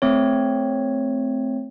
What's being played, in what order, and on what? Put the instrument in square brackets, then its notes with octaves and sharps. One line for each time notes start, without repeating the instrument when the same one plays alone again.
[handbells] A3 C4 C#5